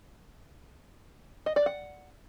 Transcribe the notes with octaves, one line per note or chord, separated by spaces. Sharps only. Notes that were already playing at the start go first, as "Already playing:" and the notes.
D#5
D5
F#5